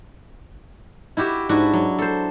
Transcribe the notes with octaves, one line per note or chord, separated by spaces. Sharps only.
E4 F#4 G4 E5
G#2 D4 E4 F#4
F#3
A4 C5